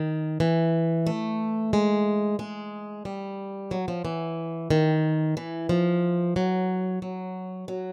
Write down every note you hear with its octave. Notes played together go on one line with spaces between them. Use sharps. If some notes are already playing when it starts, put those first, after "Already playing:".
Already playing: D#3
E3
A3
G#3
G#3
G3
F#3
F3
E3
D#3
E3
F3
F#3
F#3
F#3